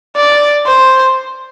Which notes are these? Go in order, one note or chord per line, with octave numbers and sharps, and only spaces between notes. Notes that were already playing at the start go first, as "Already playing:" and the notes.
D5
C5